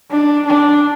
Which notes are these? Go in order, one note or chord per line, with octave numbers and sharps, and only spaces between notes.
D4
D4